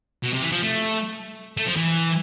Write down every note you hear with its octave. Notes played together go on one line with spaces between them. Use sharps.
B2
C3
E3
F3
A3
A3
F3
E3